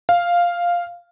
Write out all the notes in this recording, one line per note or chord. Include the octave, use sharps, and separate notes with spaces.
F5